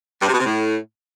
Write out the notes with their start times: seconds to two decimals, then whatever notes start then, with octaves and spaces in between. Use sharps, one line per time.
0.22 G2
0.28 C3
0.34 B2
0.40 C3
0.46 A2